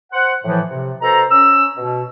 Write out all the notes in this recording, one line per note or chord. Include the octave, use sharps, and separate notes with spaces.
C5 F#5
A2 E3 F3
C3
B2 A4 C5 A#5
C#4 E6
B2